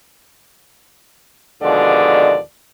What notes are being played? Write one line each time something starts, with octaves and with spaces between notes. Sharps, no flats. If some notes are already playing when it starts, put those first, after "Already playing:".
D#2 B2 D3 F3 G#3 D5